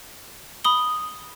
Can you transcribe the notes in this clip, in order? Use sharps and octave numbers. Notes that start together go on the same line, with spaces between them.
B5 D#6 G7